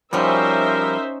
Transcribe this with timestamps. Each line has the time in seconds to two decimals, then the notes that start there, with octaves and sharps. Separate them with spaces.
0.13 F3 G3 C#4 D#4 F#4 A#4 C5 E5